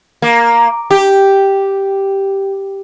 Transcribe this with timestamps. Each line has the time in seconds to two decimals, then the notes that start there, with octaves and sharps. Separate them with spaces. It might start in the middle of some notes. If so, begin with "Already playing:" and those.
0.22 A#3
0.91 G4